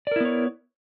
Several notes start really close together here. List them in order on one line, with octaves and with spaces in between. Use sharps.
D5 A#4 E4 B3 C#5